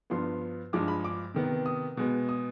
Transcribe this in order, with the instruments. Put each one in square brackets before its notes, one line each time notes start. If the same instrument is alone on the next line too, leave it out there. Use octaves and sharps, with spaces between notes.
[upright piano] G2 F3 B3 C6
G2 F3 G#3 D6
B5
D6
C3 D#3 B3
D#6
B2 G#3 B3
D#6